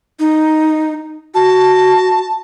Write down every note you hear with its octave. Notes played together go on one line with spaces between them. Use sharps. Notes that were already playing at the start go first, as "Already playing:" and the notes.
D#4
F#4 A5